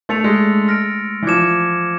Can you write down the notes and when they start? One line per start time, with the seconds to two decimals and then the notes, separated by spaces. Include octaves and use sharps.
0.09 A3 E6 A6 C#7 F7
0.24 G#3
0.68 F6 A#6 D7
1.22 E3
1.27 F3 D6 F6 G#6 C#7 E7